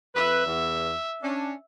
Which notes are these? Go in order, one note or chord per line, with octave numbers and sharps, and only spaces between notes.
F2 B4 E5
E2
C#4 D4